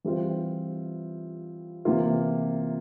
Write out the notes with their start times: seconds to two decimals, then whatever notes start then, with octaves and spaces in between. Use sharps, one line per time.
0.04 E3 G3 C4 F4
1.85 C3 E3 A#3 F4